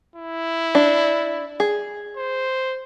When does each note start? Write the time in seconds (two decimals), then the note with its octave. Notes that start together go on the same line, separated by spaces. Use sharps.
0.16 E4
0.75 D4
1.60 G#4
2.17 C5